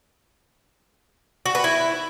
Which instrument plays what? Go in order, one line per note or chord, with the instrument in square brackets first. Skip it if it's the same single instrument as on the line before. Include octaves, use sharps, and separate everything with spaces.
[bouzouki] F#4
B4
E4